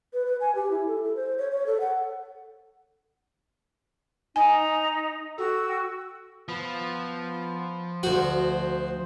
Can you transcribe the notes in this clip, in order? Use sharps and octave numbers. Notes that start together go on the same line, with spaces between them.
B4
B4
G#5
G4
E4
A4
A4
C5
C#5
C#5
A4
F#5
D#4 G#5
F#4 A4 G5 E6
F3 B3
D2 F#4 C5